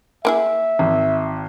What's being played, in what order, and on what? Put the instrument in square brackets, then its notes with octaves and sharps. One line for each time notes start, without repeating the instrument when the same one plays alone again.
[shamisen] A#3 E4 G#4 [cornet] E5
[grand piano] G#1